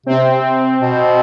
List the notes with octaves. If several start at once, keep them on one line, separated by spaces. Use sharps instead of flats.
C3 C4
B2